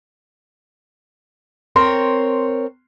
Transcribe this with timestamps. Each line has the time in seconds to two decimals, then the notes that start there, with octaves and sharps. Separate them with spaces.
1.76 C4 A#4 C#5 C6